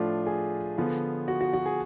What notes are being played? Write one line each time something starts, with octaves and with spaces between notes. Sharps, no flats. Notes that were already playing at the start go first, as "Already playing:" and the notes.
Already playing: A2 F3 A3 D4 F4
G#4
D3 F3 B3 F4
F#4
F#4
F#4
G#4